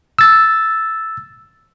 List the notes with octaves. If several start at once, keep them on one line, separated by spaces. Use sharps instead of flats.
E6 A6